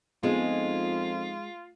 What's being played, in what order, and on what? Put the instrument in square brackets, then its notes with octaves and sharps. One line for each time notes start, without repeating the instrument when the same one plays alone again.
[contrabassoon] F2 [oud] G#3 [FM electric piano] B3 D#4 [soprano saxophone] F4